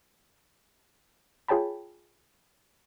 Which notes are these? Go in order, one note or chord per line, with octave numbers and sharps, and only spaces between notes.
F4 G#4 C#5 G5 A5 B5